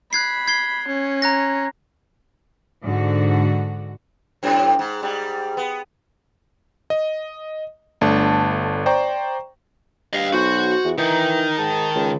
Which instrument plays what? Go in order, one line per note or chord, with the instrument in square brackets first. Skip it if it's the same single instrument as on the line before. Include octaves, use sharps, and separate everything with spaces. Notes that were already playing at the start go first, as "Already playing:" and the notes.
[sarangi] B5 [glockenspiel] F#6 G#6 C7
[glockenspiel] G#6 C7 G7
[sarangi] C#4
[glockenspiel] A#5 F#6 A#6
[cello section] G#2 D3 F#4
[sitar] F#2 A2 C3
G#2
G#2 G3
B3
[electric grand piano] D#5
G1 A3 D4 A5
C5 D5 G5 A#5 C#6
[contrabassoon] G2 [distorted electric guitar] D#5 F5
[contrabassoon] B1 [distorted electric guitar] F#4 [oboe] C5
[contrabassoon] E2
[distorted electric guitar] D#3 [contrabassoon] E3 [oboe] D#4
[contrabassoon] G#2 [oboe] A5
[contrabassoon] C#2